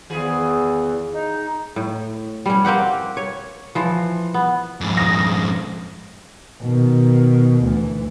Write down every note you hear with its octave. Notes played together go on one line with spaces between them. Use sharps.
E2 D#3 F4 G#4
D#4
A2
G3 C#4
A#3 C4 G4 F#5
C#5
E3 F3
B3
F2 G#2
D#6 A#6
B2 D#3
D2 E3